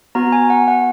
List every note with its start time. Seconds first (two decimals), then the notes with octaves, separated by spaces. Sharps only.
0.15 B3 F#4 A#5
0.32 G#5
0.50 F#5
0.68 F#5